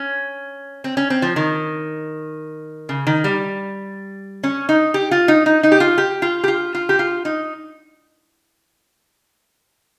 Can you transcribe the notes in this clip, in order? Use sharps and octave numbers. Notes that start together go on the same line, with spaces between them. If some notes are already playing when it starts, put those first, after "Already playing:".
Already playing: C#4
C4
C#4
C4
F3
D#3
C#3
D#3
G3
C#4
D#4
G4
F4
D#4
D#4
D#4
G4
F4
G4
F4
G4
F4
F4
G4
F4
D#4